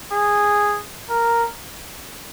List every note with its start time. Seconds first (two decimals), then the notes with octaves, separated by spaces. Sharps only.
0.12 G#4
1.09 A#4